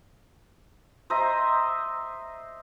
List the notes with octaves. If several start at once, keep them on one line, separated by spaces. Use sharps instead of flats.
C5 D#5 E5 A#5